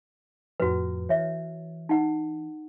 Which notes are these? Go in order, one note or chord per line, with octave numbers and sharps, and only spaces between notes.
F2 A2 F3 F#4 B4
E3 C#5 E5
D#4 F#5